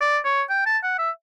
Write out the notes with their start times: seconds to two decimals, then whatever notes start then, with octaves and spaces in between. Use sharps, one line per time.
0.01 D5
0.25 C#5
0.50 G5
0.66 A5
0.83 F#5
0.99 E5